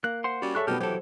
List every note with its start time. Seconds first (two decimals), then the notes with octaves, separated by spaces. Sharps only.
0.04 A#3 F#6
0.24 C5 F#5 C6
0.42 G3 C#4 F#4
0.55 G#4 A4 C#5 E5 C#6 F#6
0.67 B2 G3 B3 D#4 G4 A5 F6
0.80 E3 F#3 G4 A4 C5